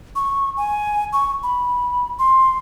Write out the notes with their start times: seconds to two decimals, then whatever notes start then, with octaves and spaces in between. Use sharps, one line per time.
0.15 C#6
0.57 G#5
1.13 C#6
1.43 B5
2.19 C6